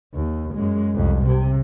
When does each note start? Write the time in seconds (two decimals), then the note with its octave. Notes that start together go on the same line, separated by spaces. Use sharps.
0.14 D#2
0.54 F#2 G#3
0.95 C2 F2
1.25 C3